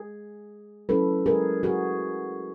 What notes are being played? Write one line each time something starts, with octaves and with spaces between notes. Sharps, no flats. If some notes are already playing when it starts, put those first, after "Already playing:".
Already playing: G#4
F#3 A3 C#4 E4 A4 B4
G#4 A#4
F#4 G#4